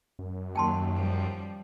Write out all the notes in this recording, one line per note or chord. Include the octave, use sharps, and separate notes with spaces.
F#2
D#2 F#3 G5 A5 C6
F3 G3